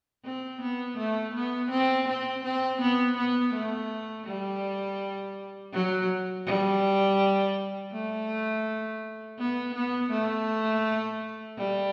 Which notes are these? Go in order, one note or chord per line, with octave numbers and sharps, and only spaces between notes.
C4
B3
A3
B3
C4
C4
C4
B3
B3
A3
G3
F#3
G3
A3
B3
B3
A3
G3